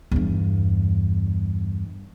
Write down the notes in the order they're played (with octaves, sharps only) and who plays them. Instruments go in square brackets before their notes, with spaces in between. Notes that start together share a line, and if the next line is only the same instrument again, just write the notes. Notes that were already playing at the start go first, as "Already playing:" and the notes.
[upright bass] E2 G2